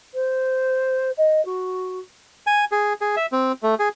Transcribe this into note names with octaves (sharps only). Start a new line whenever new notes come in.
C5
D#5
F#4
G#5
G#4
G#4
E5
C4
A3
G#4